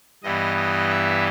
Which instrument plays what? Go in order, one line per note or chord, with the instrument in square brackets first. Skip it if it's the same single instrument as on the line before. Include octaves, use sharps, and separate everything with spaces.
[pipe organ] G2 E3 G3 B3 D#5
D#5
E5